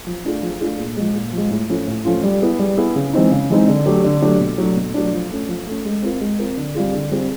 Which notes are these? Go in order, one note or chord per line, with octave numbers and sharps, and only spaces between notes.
F3
A3 D4 F4 G#4
F3
A3 D4 F4 G#4
A#2
F3 G#3
A#2
F3 G#3
A2
F3 A3 C#4 F4
A2
F3 A3 C#4 F4
G3
B3 E4 G#4
G3
B3 E4 G#4
C#3
E3 G#3 C4 D#4
C#3
E3 G#3 C4 D#4
D3
F#3 A3 D4 G4
D3
F#3 A3 D4 G4
B2
F#3 A3 D4
B2
F#3 A3 D4
F3
A3 C#4
F3
A3 C#4
G#3
C4 F4 A#4
G#3
C4 F4 A#4
D3
G3 C4 F4 G#4
D3
G3 C4 F4 G#4